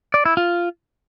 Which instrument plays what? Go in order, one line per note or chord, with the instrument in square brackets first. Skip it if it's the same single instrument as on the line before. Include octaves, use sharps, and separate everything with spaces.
[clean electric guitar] D5
E4
F4